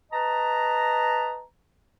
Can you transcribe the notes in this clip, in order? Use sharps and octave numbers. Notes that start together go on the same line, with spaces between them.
B4 D#5 A5 A#5